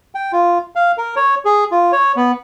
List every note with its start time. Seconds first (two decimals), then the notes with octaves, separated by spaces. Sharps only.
0.15 G5
0.32 F4
0.76 F5
0.98 A#4
1.16 C#5
1.45 G#4
1.71 F4
1.92 C#5
2.16 B3